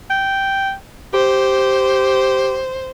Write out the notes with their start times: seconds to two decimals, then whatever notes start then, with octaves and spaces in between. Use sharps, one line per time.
0.10 G5
1.14 G4 C5